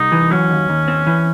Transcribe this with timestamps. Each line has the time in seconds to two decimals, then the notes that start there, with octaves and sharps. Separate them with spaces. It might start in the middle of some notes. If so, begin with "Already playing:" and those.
Already playing: C2 D#4
0.12 E3
0.31 F#3 C#4
0.50 D#2
0.69 D#2
0.88 C4
1.07 E3